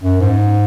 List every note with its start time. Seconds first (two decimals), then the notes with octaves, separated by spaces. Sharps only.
0.03 F#2
0.20 G#2